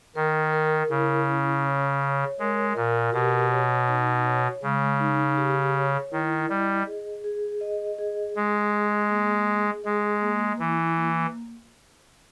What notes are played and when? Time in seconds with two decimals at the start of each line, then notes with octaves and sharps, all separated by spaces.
0.15 D#3 A#4
0.53 A#4
0.90 C#3 E4
1.28 C#4
1.65 C#5
2.02 C#5
2.39 G#3 A#4
2.76 A#2 A#4
3.14 B2 G4
3.51 C#5
3.88 D#4
4.26 C#5
4.63 C#3 G#3
5.00 D#4
5.38 G4
5.75 C#5
6.12 D#3 E4
6.49 G3 D#5
6.87 G#4
7.24 G#4
7.61 D#5
7.98 G#4
8.35 G#3 G#4
8.73 G#4
9.10 A#3
9.47 G#4
9.84 G#3 G#4
10.22 A#3
10.59 E3 E4
10.97 A#3